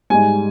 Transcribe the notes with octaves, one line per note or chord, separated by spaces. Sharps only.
G#2 G3 G#5